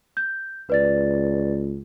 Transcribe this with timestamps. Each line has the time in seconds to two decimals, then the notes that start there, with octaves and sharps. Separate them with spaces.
0.17 G6
0.70 C#2 B4 D5 A6